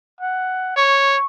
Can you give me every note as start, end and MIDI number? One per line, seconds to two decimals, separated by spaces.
0.21 0.75 78
0.77 1.17 73
0.77 1.26 85